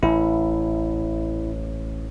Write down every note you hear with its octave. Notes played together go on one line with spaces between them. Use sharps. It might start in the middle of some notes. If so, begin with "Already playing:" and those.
A1 E4